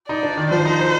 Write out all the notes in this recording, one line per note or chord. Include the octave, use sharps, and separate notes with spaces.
D#4 D5
D4
D#3
F3 C5
D#4
D#4